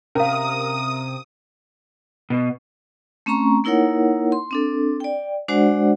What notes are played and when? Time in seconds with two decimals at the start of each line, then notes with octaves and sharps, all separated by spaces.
0.15 C3 C#4 A#4 F5 D#6
2.30 B2
3.26 A3 C4 C#4 A#5 C#6
3.64 A#3 D#4 E4 A#4 C#5 F#5
4.32 C6
4.51 C4 D4 A4
5.00 D5 G5
5.48 G#3 D4 F#4 C5 D5 F#5